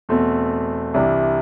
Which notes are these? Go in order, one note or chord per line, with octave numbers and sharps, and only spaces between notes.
E2 B2 A3 C4
C2 C3 E3 G3 D4